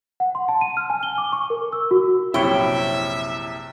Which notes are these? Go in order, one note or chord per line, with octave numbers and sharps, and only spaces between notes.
F#5
C6
A5
D#7
F6
G#5
G7
D6
C#6
A#4
E6
F#4
A#1 F#2 C3 E4 C#5 E5 G5